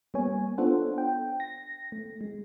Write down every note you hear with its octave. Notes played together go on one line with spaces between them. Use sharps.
G3 A#3 B3 C#5 G#5
B3 D4 F4 A4 C5 F#5
G5
A#6
A3
G#3